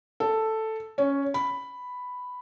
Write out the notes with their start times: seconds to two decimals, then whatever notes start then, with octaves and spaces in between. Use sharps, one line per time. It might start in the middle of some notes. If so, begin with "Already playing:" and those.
0.20 A4
0.98 C#4
1.34 B5